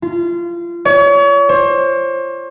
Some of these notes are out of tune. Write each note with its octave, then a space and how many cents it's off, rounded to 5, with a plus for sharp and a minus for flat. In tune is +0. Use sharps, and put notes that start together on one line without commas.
F4 -25
C#5 +35
C5 +35